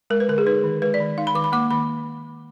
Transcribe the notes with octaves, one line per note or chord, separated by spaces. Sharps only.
G#3 A#4
B4
D3 A#4
G#4
D#4 B4
D#3
G#3 B4
D5
D#3
D#4 F5
B5
D#3 D6
B5
A#3 D6
D#3 B5